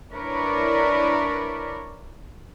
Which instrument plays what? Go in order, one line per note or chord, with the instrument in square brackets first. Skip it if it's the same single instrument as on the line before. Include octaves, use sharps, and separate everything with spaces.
[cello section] D4 E4 A#4 B4 C#5 D5